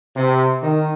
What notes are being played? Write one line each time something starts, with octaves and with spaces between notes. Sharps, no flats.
C3
D#3